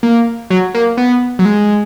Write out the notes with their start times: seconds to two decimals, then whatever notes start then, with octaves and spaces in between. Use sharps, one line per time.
0.03 A#3
0.50 F#3
0.75 A#3
0.97 B3
1.39 F#3
1.45 G#3